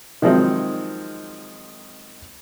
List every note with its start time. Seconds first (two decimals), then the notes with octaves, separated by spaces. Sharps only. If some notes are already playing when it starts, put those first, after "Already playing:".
0.22 D#3 F3 F#3 G#3 C4 D#4